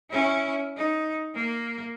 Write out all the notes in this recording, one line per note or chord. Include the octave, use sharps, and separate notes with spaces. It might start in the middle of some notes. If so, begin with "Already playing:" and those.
C#4 E4
D#4
A#3